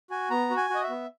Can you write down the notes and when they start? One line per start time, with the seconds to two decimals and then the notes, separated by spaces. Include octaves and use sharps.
0.10 F#4 G#5
0.30 B3 A#5
0.50 F#4
0.57 G#5
0.70 F#4
0.75 D#5
0.83 E5
0.90 B3